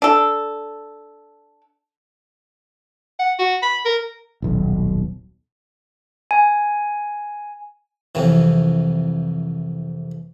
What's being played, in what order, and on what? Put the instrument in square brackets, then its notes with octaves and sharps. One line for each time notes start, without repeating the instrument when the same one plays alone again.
[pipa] D4 A4
[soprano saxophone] F#5
F#4
B5
A#4
[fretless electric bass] D#1 B1
[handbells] G#5
[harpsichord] C2 F2 E3